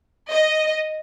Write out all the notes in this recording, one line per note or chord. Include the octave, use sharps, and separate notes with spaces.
D#5